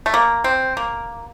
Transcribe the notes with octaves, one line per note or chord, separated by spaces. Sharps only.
A3
A#3
C4
A#3